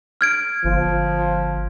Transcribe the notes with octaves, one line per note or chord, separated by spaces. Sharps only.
F6 G#6 D7
G1 F3